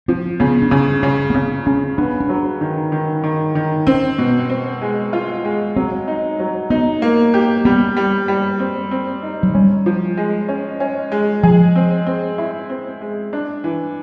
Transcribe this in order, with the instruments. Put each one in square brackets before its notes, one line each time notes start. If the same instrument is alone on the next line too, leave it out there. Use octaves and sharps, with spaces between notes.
[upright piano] F3 [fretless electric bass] C4
[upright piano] C#3 [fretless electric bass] B3
[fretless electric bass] D4
[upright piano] C#3 [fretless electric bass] C#4
[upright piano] C#3 [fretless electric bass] C#4
[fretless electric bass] B3
[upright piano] C#3 [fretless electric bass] C4
[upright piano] C#3 [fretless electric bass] C#4
[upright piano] B3 [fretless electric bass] D4
[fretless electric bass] D4
[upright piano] F#3
D#3
D#3
D#3
D#3
[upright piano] C4 [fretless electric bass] C#4
[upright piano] B2
C4
G#3
F4
G#3
[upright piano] F#3 [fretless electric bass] C4
[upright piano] D#4
F#3
[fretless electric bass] B3 [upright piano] D#4
[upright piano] A#3
G4
[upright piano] G3 [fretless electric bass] B3
[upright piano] G3
G3
C4
C4
D#4
[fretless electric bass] F#3
[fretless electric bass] G3 [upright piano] C#4
[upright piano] F3
G#3
C#4
C#4
G#3
[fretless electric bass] F3 [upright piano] G#4
[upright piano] C4
C4
E4
C4
G#3
D4
E3